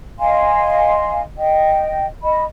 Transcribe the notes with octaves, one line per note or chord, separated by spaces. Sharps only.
D#5 F5 G#5 C6
D#5 G5
D#5 B5